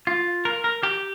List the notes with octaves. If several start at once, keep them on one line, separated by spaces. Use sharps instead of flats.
F4
A#4
A#4
G4